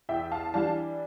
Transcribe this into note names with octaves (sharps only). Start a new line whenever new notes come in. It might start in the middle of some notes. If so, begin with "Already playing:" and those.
E2 E5 G5
F5 A5
E3 G3 D4 F5 A5